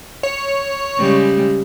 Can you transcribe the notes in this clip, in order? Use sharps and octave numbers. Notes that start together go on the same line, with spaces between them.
C#5
C#3 G3 G#3